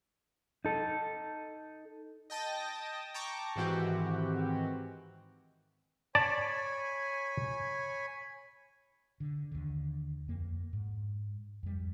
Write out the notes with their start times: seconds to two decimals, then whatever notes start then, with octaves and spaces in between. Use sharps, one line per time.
0.65 D#4 A4
2.30 D#5 G5 A5 D#6 A#6
3.14 G5 A5 A#5 C#6 D6
3.56 G#2 D#3 E3 C4 F#4 G4
6.15 C#5 D5 G#5 A5 B5
9.20 D3
9.52 D#2 D3
10.28 F2 A#3
10.73 G#2
11.63 F2 G3